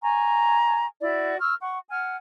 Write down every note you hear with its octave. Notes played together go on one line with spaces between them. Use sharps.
G#5 A#5 C#6
E4 F#4 D5
C#6 E6 F6
F#5 C#6
F#5 G#5 F6